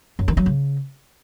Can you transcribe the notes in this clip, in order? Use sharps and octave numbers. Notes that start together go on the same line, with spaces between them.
F#2
D#3
F#3
C#3